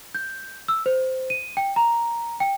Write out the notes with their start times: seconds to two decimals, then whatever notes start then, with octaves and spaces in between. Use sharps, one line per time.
0.15 G6
0.68 E6
0.86 C5
1.30 D#7
1.57 G5
1.76 A#5
2.40 G5